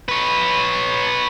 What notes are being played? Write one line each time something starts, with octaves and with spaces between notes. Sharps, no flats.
B4 C#5